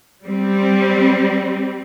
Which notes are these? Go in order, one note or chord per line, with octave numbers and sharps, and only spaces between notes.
G3 C4